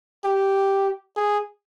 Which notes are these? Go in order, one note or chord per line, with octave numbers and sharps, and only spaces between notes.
G4
G#4